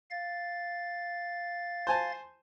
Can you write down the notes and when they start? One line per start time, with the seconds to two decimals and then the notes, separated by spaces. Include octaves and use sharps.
0.11 F5 A6
1.87 C5 G#5 A5